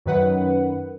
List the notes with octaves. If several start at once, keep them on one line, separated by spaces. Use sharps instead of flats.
F#2 D#3 B4 F#5